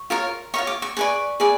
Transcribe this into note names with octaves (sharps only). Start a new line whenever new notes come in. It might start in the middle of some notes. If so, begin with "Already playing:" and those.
Already playing: C#6
F4 A#4 C#5
F4 A#4 C#5 C#6
D6
C#6
G#4 B4 D5 C#6
G#4 B4 D5